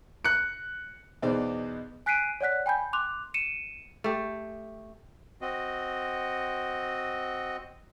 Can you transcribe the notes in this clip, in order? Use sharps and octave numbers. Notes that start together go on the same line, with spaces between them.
F#6 C#7
E2 B2 D#4 C5 D5
G#5 F#6 B6 C7 D7 D#7
C#5 D5 F#5 F#6 B6
G5 G#5 B5 G6
C6 D6 F#6 F7
C#7 D#7 E7
A3 G4
C4 F#4 D#5